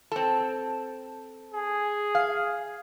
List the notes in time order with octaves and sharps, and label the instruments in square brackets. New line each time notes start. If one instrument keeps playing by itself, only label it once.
[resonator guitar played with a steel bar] C4 A4
[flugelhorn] G#4
[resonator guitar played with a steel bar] F5